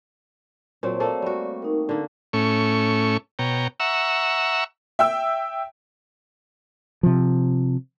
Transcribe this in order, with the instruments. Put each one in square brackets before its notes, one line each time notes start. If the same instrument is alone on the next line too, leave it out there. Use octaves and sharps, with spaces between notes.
[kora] A#2 F#3 C4 [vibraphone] C5 A5
[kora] A3 A#3 A4 [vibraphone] C#5 D5
[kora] G3 F#4
[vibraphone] D#4 A#4
[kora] D3 A#3
[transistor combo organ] A2 A3 C#4 C#6
B2 C#5 G5 A#5
E5 F#5 A#5 C#6 E6
[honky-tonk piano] E5 G5 E6
[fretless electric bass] C3 F3